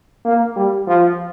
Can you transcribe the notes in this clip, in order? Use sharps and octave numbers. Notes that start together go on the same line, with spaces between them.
A#3
G3
F3